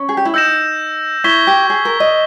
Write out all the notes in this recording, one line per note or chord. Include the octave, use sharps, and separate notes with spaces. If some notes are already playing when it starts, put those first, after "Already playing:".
Already playing: C#4
G#4
G4
E4
D#4 E6 G6 A#6 E7
E4 C#6 G#6 B6 E7 G7
G4
G#4
A#4
D#5